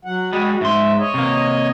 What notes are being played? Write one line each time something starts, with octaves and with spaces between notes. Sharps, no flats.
F#3 F#5
G3 G#3 F#4
G#2 E5 C6
C#5 D#5
C3 A#3